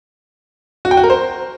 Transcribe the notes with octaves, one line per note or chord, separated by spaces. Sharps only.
F#4
G5
F#4
A#4
C5